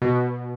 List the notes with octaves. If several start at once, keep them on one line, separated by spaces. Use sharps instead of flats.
B2